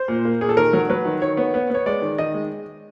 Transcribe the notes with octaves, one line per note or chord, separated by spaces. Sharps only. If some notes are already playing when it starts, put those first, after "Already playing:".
Already playing: C5
A#2
A#3
A#2 G#4
A4
D#3 A#4
F#3
F#3 B4
D#3
D#3 C#5
B3
B3
B3 C#5
G#3 D5
D#3
D#3 D#5
G#3